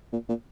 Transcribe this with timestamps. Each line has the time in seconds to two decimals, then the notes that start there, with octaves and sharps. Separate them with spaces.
0.12 A#2
0.29 A#2